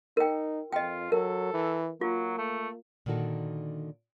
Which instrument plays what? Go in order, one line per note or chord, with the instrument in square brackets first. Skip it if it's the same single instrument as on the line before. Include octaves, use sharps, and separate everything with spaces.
[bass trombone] D#4 [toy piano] A#4 G5
[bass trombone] F2 [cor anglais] F4 [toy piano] D#5 G5
[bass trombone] F#3 [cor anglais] A4 [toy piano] A#4
[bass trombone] E3
[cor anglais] F#3 [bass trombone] A#3 [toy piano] F4
[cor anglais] A3
[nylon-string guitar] A#2 D3 D#3 F#4 A4